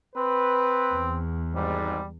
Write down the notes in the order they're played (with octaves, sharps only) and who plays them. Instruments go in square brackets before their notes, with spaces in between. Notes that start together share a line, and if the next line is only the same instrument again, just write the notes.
[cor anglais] C4 [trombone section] B4
[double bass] E2
[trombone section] G#1 G#2 [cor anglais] G3